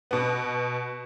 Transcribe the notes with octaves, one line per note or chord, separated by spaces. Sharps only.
B2 B3